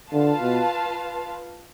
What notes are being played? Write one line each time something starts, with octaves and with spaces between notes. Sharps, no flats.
D3 F4 B4 F5 A5
B2